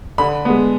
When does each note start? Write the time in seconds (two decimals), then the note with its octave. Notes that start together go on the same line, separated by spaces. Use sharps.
0.18 D3 B5
0.45 G#3 B3